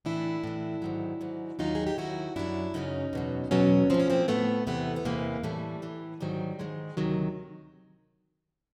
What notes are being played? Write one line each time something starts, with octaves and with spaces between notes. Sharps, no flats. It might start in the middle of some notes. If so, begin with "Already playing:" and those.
A2 E3 D4 E4
A2 E3
G#2 D#3 F#3
G#2 D#3 F#3
D#2 D#3 F#3 D#4 F4
G#4
G4
D#2 D#3 F#3 E4 F#4
F#2 C#3 F#3 D4 E4
F#2 C#3 F#3 C#4 D#4
E2 B2 F#3
E2 B2 F#3 B3 C#4
A2 F3 C4
C#4
A#3 C4
A2 F3 A3 B3
E2 C3 E3 A3 B3
B3
E2 C3 E3 G#3 A#3
A2 E3 G3 A3
A2 E3
G#2 D#3 F#3 G3
G#2 D#3 F#3 G#3
D2 C3 D#3 F#3